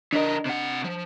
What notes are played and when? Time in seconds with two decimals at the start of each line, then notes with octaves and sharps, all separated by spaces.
0.13 E3 D4 A#4 D#5
0.45 C3 F#5
0.84 F3